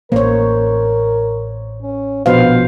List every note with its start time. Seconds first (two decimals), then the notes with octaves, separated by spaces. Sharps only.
0.12 A1 A#3 A#4 C5 C#5
1.82 C#4
2.26 A#1 B2 B3 B4 C5 F5